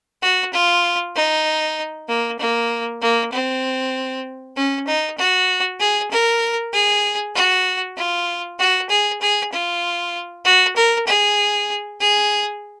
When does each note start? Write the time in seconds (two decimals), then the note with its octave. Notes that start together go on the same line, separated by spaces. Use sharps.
0.22 F#4
0.53 F4
1.15 D#4
2.09 A#3
2.39 A#3
3.01 A#3
3.32 C4
4.57 C#4
4.87 D#4
5.18 F#4
5.80 G#4
6.11 A#4
6.73 G#4
7.35 F#4
7.97 F4
8.59 F#4
8.90 G#4
9.21 G#4
9.52 F4
10.45 F#4
10.76 A#4
11.07 G#4
12.00 G#4